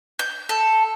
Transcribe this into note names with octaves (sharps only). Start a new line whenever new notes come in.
G6
A4